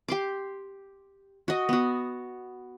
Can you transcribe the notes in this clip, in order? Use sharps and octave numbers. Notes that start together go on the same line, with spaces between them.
G4 C6 D6
F#4 D#5
B3 F#4